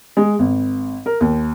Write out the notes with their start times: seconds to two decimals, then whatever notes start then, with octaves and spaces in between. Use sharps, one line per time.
0.17 G#3
0.39 G#1
1.06 A#4
1.21 D#2